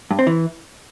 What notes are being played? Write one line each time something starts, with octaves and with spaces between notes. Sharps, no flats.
G2
C4
E3